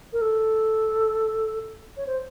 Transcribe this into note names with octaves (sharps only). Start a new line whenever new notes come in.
A#4
A4
C#5
C5